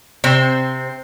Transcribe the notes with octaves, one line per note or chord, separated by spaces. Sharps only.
C3 C4